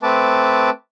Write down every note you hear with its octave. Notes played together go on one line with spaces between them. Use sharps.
A3 C4 B4 A5 D6